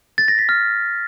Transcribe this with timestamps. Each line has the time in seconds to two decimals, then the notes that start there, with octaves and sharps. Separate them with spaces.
0.18 A6
0.28 A#6
0.39 B6
0.49 F6